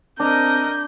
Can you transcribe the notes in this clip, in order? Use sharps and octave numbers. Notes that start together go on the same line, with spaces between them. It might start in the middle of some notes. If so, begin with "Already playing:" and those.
C4 D4 A#4 D#5 G6